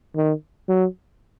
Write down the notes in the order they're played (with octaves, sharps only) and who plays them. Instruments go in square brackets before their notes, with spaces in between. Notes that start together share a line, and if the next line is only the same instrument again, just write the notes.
[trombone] D#3
F#3